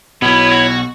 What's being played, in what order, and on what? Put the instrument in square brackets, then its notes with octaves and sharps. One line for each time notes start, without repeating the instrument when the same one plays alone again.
[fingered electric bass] B1 B2 [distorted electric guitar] B3 [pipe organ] E4 C#5
[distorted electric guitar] F#4